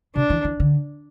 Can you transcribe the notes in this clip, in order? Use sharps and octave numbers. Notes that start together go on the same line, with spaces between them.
C3 D4
E3
E3
D3